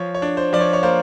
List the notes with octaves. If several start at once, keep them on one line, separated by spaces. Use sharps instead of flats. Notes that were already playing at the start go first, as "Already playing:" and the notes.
Already playing: F3 C#5
C#5
D4
C5
F3 D5
C#5
C#5
A#3 C5